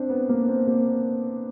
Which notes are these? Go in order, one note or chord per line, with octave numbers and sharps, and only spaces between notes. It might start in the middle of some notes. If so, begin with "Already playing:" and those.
Already playing: C4 D4
B3
A#3
C4
A#3